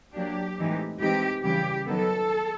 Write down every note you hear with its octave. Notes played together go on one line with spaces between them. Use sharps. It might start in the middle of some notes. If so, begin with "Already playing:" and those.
F#3 A#3 D4 G4
A2 E3 G#3 C4 D#4
E3 G#3 C4 D#4 G4
C#3 E3 G3 G4
D#3 F#3 B3 A4